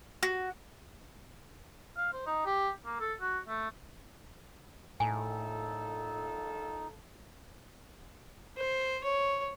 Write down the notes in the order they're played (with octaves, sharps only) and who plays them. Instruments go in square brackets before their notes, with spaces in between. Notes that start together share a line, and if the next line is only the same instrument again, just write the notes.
[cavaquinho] F#4
[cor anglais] F5
C5
D#4
G4
A#3
A4
F#4
A3
[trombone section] A#1 F4 A4 [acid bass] A2 [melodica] D#4 [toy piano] G#5
[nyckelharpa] C5
C#5